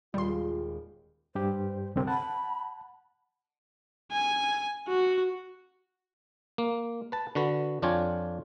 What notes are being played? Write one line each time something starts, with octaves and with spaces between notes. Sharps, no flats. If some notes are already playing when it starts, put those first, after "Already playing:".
D#1 D#2 G3 G#3 F4 C6
G2 G4 C5
C2 D3 C4 A#4
F#5 A5 B5
G#5
F#4
A#3
B4 A5
D3 F#4 B4
F2 D4 F4 C#5 G5 G#5